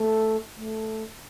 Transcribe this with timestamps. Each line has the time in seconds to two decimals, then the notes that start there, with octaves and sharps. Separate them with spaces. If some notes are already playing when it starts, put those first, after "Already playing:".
Already playing: A3
0.57 A3